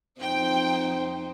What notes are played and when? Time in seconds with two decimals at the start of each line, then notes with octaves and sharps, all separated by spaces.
0.21 F2 D#4 C5 G5